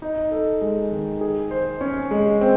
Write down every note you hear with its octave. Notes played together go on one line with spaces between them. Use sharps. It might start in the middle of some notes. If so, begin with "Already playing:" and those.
D#4
A4
G#3
D#3
G#4
C5
C#4
G#3
C4